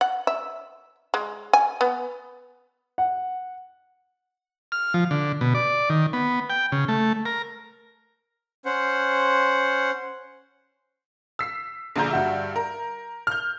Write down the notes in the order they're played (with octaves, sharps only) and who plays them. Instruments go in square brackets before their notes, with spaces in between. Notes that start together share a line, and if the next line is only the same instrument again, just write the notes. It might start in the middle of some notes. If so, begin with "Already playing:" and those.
[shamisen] F#5
E5
G#3
G#5
B3
[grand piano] F#5
[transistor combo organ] F6
F3
D3
B2
D5
D#3
B3
G5
C#3
A3
A#4
[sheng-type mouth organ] C#4 C5 F#5
[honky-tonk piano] E6 B6 C7
A#1 A#2 D3 G#4 A#5 G6
G2 F#4 E5
A#4
F6 G6